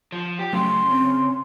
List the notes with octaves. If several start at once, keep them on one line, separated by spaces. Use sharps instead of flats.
F3
G4
C#3 F#3 A3 C6
C4